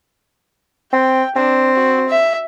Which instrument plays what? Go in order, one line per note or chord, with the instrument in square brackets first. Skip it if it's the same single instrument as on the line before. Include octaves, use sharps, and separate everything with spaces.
[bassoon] C4 [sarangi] G5
[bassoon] C4 [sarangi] D4
[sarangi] F#4
E5